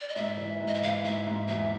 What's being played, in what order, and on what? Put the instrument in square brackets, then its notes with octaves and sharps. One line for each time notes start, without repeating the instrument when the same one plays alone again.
[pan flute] D5
D#5
[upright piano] G#2 [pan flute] E5
[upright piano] E3
G#2
[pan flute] D#5
E5
[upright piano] E3 [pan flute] F5
[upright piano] G#2 [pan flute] E5
[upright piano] G#2
[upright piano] E2 [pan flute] E5